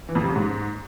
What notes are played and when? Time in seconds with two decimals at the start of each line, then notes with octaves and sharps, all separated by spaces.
0.09 E3
0.15 F2
0.22 C3
0.29 C#3
0.36 G#2